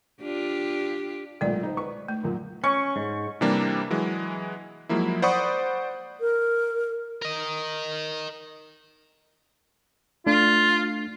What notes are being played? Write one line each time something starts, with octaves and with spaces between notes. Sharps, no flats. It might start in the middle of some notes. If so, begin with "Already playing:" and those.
D4 F4 G4
B1 A#2 G#3 A3 D5
D#4 C5
B4 C#6
A3
F#2 A#2
C#4 C#6
G#2
C3 E3 G3 A#3 D4
E3 F#3 G#3
F3 F#3 G#3 A#3 E4
C5 D5 F#5 B5 C#6 D#6
A#4
A#4 D#5
A3 D4 F4